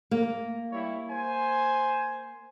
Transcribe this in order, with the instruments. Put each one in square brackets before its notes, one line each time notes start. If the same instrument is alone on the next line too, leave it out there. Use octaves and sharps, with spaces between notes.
[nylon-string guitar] A#3
[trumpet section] G3 E4 C#5
C5 G#5